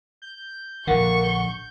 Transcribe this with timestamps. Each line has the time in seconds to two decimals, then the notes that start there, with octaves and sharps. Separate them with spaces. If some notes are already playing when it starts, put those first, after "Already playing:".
0.22 G6
0.87 A#1 D3 A#3 F#5 C#6
1.24 G6